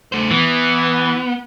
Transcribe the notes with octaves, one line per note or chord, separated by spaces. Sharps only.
A3 C5
E3 B3